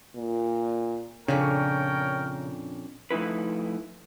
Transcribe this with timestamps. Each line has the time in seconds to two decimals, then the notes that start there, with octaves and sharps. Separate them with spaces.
0.16 A#2
1.28 F2 A#2 C#3 C#4 D4 A#4 C#5 G5
3.11 F3 A3 D#4 E4 B4